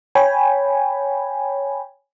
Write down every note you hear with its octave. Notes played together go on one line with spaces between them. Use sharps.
C#5 G5 G#5 B5